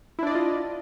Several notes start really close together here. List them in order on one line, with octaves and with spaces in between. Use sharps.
E4 D4 D5 D#5 F4